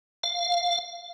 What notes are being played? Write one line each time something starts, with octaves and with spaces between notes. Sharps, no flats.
F5